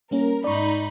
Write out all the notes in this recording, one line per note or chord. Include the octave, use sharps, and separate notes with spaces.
G3 A#3 C#4 A#4
G#2 D#4 D5 B5 C#6